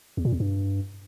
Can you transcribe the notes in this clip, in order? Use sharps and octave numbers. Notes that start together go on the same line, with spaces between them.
E2
A#2
E2
G2